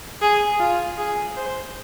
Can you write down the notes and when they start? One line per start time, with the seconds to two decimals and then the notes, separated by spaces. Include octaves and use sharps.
0.22 G#4
0.60 F4
0.98 G#4
1.37 C5